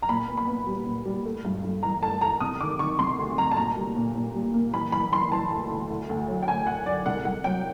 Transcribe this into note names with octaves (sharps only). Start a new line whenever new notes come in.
A#5
A#2 B5
B3
B5
B3
G3
A#2
G3
A3
G2
G2
E3 A#5
A3 A5
A3 A#5
C3 D#6
D#3 D6
D#3 C#6
C3 C6
D2
D2 A#5
A5
A#2 A#5
G3
A#2
A#2
G3
A#3
E3 B5
E3 B5
E3 C6
E3 A5
D2
D2
D2
D2
F#3
G5
D2 G#5
D2 F#5
D3 D5
C2 F#5
C2 F#5
F#3 G5